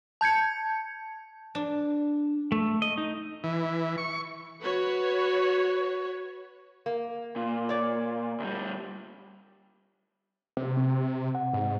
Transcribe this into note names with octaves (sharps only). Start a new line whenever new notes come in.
A5 G6 G#6 C#7
D4
A3
D#5
D#4
E3
C#6
F#4 B4 C#5
A#3
A#2
C#5 D5
D2 G3
C3
C4
F#5
G#2